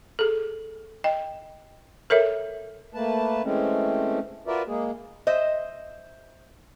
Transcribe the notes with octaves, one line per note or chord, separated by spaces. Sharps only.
G#4 A4
D#5 G5
A4 A#4 C#5 E5
A3 A#3 B4 A5
E3 G#3 A3 C4 C#4
F4 F#4 A#4 B4 D5 E5
G#3 A#3 G#4
C5 D#5 E5